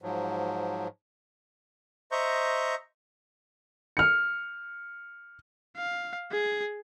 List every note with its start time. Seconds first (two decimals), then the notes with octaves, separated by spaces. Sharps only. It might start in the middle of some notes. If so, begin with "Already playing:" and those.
0.02 G#2 F3 F#3
2.12 C5 D#5 E5 A#5 C#6 G6
3.97 F6 C#7
5.76 F5
6.32 G#4